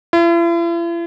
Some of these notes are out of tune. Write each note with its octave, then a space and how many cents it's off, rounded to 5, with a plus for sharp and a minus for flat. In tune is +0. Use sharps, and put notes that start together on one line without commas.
E4 +45